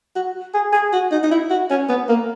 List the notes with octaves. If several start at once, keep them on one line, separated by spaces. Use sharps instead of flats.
F#4
G#4
G#4
F#4
D#4
D#4
E4
F#4
C#4
B3
A#3